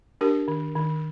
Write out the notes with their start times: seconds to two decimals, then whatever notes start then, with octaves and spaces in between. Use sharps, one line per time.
0.21 D4 G4 A#4
0.48 D#3
0.76 D#3